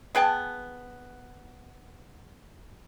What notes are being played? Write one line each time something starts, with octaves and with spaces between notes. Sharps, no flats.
B3 G#4 G5 A5